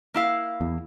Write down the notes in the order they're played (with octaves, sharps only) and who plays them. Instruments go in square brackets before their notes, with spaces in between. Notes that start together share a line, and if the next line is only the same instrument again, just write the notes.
[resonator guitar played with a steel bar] A#3 E4 F5
[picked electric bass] E2